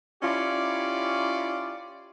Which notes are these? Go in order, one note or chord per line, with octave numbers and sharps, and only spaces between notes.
C#4 E4 F4 G4 D5